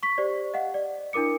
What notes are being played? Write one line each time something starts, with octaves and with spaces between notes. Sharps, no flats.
C#6 B6
G4 C5 D5
D#5 F5 F#5
D5
D4 E4 A#4 D6 C#7